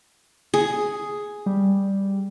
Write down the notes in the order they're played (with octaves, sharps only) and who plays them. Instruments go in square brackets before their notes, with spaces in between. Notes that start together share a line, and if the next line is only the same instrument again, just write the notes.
[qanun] G#4
[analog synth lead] G3